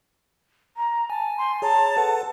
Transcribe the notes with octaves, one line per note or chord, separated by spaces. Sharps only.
A#5
G#5 A5
C6
G#4 C#5 A5 A#5
A4 B4 F#5